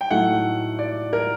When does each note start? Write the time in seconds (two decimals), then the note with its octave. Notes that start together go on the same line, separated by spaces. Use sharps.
0.01 G5
0.11 A2 F#3 A3 D#4 F#5
0.79 D5
1.13 A#4